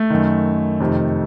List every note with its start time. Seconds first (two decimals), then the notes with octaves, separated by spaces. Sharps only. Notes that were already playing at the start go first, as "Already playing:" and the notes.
Already playing: A3
0.10 F#2 D#3
0.80 F2 C3 D#3